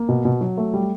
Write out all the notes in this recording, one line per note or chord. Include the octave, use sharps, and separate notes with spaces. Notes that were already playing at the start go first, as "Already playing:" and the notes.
Already playing: A#3
B2
B2
F#3
A3
G3